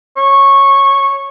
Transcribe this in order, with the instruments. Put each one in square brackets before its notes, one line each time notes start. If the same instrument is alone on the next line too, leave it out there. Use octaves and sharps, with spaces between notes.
[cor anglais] C#5